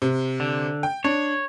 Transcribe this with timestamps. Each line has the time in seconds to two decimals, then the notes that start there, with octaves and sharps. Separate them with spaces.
0.02 C3
0.40 D3
0.83 G5
1.04 D4 C#5